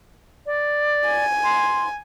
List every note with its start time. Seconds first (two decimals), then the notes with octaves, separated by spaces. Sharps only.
0.46 D5
1.07 G#5
1.43 C6